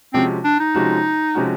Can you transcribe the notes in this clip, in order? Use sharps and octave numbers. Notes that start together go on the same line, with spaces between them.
C3 F3 G#3 C4 C#4 F#4
D4
D#4
C3 F3 G#3 C#4 F#4
C3 F3 G#3 C#4 F#4